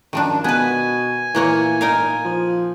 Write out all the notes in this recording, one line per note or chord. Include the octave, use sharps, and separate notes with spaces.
F#2 D#3 F3 D4
B2 B3 B4 G#5
A#2 E3 A#3 C#5
D#4 A#4 F5
F3